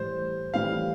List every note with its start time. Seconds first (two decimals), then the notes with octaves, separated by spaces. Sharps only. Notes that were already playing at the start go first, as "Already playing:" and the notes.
Already playing: A2 E3 G3 C5
0.54 A2 E3 G3 F5